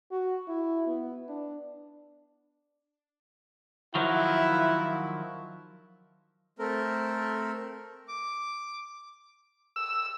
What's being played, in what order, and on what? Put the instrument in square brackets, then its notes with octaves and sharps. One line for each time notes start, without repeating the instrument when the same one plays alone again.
[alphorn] F#4
E4
B3
D4
[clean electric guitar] D#3 F3 F#3 [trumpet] E4 [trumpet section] F4 E5 F#5
[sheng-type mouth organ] A3 C4 A4 A#4
D6
[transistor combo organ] E6